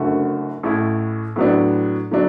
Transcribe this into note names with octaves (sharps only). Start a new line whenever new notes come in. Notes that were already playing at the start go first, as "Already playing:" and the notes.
Already playing: F#1 F#2 D3 A3 F#4
A1 A2 A3 E4
A2 F#3 B3 D4
D3 F#3 D4